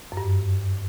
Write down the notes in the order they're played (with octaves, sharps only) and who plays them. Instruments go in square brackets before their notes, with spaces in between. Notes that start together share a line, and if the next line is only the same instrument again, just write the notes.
[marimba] F#2
G2